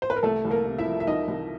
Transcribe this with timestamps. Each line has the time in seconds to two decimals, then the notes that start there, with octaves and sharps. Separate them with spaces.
0.02 C5
0.10 B4
0.16 A#4
0.23 C2 A3 A4
0.45 C2
0.51 A#3 A#4
0.66 C3
0.78 E4 E5
0.85 F3
1.00 E5
1.07 C2 D#4 D#5
1.28 C2